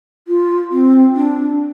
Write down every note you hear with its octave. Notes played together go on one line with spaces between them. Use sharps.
F4
C4
D4